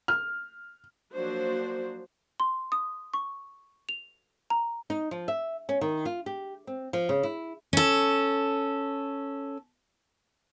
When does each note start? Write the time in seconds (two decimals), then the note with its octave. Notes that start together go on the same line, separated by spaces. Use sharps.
0.08 F6
1.12 F3 F#3 A#3 D4 F#4 C5
2.40 C6
2.72 D#6
3.14 C#6
3.89 F7
4.50 A#5
4.90 D#4
5.11 F3
5.28 E5
5.69 C#4
5.81 D#3
6.05 F4
6.26 G4
6.67 C4
6.93 F3
7.09 C#3
7.23 E4
7.73 C#4 A4